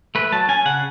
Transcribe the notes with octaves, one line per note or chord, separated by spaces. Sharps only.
A3 B4
F#3 A5
C#4 G#5
C#3 F#5